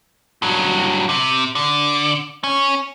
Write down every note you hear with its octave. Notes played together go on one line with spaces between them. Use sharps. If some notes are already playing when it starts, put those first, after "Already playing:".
G2 F#3
C3
D3
C#4